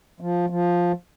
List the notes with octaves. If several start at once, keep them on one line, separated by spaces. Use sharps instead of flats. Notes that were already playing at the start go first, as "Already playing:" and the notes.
F3
F3